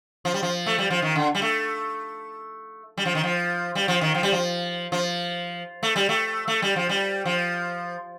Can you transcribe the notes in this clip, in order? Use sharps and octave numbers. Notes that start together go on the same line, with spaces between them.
F3
G3
F3
A3
G3
F3
D#3
D3
G3
A3
G3
F3
D#3
F3
G3
F3
D#3
F3
G3
F3
F3
A3
G3
A3
A3
G3
F3
G3
F3